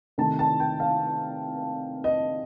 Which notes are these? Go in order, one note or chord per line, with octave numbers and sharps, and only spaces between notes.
C3 D#3 A3 A5
A5
G5
F5
D#5